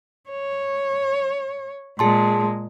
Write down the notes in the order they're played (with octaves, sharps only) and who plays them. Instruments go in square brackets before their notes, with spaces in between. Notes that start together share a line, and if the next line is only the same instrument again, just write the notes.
[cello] C#5
[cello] A#2 G#3 [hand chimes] G#4 A5 C6